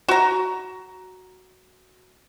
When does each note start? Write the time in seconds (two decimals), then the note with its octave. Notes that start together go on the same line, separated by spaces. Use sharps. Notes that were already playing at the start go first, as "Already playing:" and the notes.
0.08 F#4 A#5